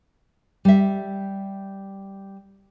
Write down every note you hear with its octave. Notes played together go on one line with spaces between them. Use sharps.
G3 E5